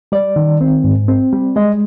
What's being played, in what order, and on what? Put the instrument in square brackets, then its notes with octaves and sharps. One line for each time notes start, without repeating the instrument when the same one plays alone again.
[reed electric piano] G3 D5
D#3
C4
G#2
C4
G3
G#3 D#5